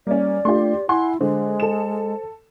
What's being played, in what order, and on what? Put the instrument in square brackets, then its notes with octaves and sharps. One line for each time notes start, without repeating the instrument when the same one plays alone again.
[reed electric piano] G3 [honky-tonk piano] A#3 C#4 [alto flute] D5
[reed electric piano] A3 D4 F4 [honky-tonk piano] G4 C6
[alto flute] E4 [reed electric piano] F#5 G#5 [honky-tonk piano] C6
[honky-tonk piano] D3 [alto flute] G#3 [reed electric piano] C5
[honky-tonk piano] A4 E7